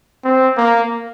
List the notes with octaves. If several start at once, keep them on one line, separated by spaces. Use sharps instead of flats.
C4
A#3